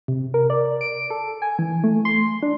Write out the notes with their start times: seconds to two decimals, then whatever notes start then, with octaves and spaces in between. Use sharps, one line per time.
0.08 C3
0.34 A#4
0.50 D5
0.81 D7
1.10 A4
1.42 G#5
1.59 E3
1.84 A3
2.05 C6
2.42 D4